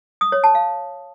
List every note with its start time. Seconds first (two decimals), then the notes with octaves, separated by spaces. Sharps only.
0.21 D#6
0.32 C#5
0.44 A5
0.55 F5